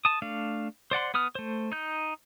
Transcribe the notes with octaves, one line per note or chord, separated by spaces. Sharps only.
A5 D#6
A3 D4 F5
C5 D5 F#5 C6
B3 B4 D#6 F6
A3 C5
D#4 G6